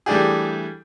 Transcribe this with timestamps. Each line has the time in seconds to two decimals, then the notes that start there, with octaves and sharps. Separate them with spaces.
0.06 E3 G3 A3 D4 G4 G#4